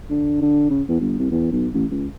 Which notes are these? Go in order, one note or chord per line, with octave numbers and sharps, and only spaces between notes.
D3
D3
C#3
E2
G1
C2
E2
B1
A1
C#2